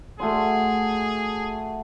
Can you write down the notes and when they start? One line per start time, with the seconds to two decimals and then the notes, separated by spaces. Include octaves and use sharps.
0.20 A3 F#4 G#4 C6